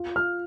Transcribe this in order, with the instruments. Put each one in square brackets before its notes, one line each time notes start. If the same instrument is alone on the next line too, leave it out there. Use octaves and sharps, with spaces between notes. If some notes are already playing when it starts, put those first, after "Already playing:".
Already playing: [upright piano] F4
[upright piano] F4 [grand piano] F6